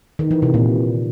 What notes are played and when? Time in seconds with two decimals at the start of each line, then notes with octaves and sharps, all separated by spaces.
0.19 D#3
0.31 E3
0.42 C3
0.54 A#2